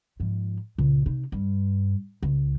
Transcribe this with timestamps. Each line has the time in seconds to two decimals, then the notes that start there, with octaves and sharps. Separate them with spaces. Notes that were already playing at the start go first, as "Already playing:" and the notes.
0.20 G#2 F3
0.78 C#2 A#2
1.06 C3 D#4
1.32 G2
2.23 C#2